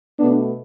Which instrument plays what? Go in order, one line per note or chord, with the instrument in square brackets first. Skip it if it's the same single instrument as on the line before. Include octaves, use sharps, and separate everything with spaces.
[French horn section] B2 A3 B3 D4